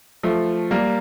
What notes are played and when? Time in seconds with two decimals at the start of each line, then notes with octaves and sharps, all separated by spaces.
0.23 F3 A3
0.71 G3 A#3